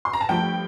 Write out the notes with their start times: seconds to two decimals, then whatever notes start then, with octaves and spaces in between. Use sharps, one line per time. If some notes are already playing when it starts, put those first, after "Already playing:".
0.05 C6
0.13 A#5
0.21 A5
0.29 G2 F3 A3 G5